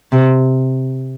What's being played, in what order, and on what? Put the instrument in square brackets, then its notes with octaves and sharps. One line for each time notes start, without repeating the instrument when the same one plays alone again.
[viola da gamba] C3